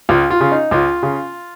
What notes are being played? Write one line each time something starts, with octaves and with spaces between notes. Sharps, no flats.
C#2 F4
F4
C#3
D#4
C#2 F4
C#3